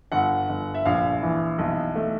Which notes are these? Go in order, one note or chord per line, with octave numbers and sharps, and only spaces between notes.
G1 F#5
G1
E5
A#1 F5
E3
B1
A3